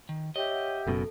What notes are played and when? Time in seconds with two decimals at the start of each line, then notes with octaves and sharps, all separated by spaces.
0.09 D#3
0.36 G4 C#5 D#5 E5
0.51 E5 F#5
0.87 F#1 F#2 B2 A4